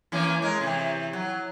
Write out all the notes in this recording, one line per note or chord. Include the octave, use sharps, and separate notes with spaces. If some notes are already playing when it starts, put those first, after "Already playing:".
E3 A#3 C#4
G#3 A#4
C3 E3
F#3